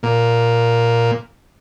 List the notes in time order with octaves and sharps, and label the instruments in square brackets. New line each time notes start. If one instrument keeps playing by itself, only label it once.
[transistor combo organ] A#2